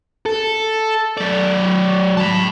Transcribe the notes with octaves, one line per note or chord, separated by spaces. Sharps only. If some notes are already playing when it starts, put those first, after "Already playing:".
A4
F#3 D5
A5 B5